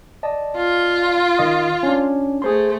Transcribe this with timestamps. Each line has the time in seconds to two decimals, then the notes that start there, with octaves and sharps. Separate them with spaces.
0.23 D5 D#5 A5
0.57 F4
1.38 D#3 D#5 D#6
1.83 C#4 D4
2.42 A3 G#4 C5 C6